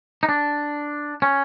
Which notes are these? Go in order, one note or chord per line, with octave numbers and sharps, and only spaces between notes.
D#4
D4
C#4